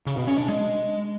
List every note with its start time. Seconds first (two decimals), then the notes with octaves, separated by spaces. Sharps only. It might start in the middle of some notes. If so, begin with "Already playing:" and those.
0.06 C#3
0.17 B2
0.27 C#4
0.38 D4
0.48 G#3